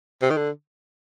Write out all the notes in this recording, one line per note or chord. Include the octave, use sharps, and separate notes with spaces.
C3
D#3
D3